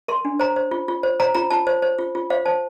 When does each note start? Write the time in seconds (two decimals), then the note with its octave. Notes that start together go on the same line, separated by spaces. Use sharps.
0.08 A#4 C6
0.25 D4
0.40 C5 A#5
0.56 C5
0.71 F4
0.88 F4
1.03 C5
1.20 C5 A#5
1.35 F4 A#5
1.50 F4 A5
1.67 C5
1.82 C5
1.98 F4
2.15 F4
2.30 C5 F5
2.45 C5 A5